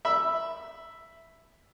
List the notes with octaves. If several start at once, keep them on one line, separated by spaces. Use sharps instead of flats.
E5 B5